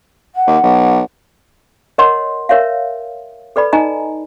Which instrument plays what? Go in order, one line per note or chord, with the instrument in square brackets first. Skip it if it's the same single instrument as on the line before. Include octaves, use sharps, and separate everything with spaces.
[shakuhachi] F#5
[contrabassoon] D#2
B1
[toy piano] A#4 C#5 D#5 F#5 C6
A#4 C#5 E5 F5
A4 B4 D5 B5
D#4 D#5 G#5 A#5